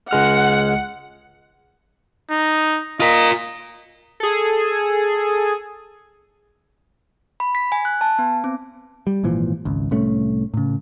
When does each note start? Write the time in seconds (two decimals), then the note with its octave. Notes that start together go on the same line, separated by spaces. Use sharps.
0.11 C#2 G#3 F#5 F6
2.31 D#4
3.00 F4 A#4 D#5
4.20 G#4 A4
7.40 B5
7.55 B6
7.72 G#5
7.85 F#6
8.01 A5
8.19 B3
8.44 C4
9.07 G3
9.24 G#1 A#2 E3 F3
9.65 G#1 C#2
9.91 C2 A2 A3 C#4
10.54 A2 C#3